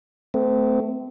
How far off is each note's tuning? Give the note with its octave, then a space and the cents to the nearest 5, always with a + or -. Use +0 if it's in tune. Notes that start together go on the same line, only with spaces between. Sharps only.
A3 +0 C4 -35